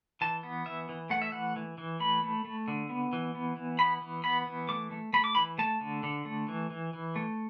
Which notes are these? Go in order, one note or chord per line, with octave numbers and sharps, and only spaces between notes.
E3 A5
B3
E3 E5
E3
A3 F#5
E5
E3 F#5
E3
E3
A3 B5
A3
A3
D3
B3
E3
B3
E3
B3 B5
E3
B3 B5
E3
A3 D6
A3
A3 B5
D6
E3 B5
A3 A5
D3
D3
A3
E3
E3
E3
A3